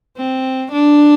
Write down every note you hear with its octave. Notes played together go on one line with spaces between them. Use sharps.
C4
D4